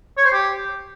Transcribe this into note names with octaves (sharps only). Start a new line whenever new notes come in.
C#5
C5
G4